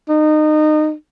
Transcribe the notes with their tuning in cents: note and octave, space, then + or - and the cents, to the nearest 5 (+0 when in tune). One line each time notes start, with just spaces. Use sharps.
D#4 -25